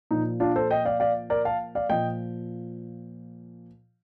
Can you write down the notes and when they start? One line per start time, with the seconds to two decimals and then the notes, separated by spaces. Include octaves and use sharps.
0.11 A#2 F3 D#4
0.40 D4 F4
0.56 A4 C5
0.71 D#5 G5
0.85 D5 F5
1.00 D5 F5
1.30 A#4 D5
1.45 F5 A5
1.75 D5 F5
1.90 A#2 F3 D#5 G5